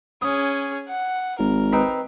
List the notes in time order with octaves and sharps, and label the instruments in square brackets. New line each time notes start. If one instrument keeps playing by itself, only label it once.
[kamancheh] C#4 G#4 [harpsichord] D#6
[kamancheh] F#5
[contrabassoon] G#1 [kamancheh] A#4
[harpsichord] C4 D#4 B4